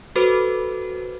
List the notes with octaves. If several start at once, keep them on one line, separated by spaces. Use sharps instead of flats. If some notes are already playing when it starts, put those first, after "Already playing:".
F#4 A4 B4 C5